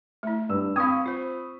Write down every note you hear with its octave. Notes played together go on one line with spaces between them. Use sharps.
A3 E4
G2 E6
C4 F5 B5 C#6 D#6
F4 C5